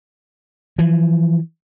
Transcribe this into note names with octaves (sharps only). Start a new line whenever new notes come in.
E3 F3